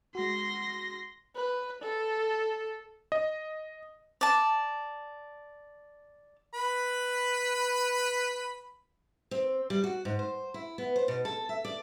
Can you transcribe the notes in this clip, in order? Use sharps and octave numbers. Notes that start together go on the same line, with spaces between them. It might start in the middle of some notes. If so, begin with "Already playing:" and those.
G#3 F#4 C6 A#6
B4
A4
D#5
D5 A5
B4 B5
C4
G3
F#4
G#2
C5
E4
B3
C5
B2
A4
E5
D5